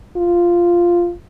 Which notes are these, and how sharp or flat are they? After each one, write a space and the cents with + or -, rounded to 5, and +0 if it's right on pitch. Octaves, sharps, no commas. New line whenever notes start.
F4 -5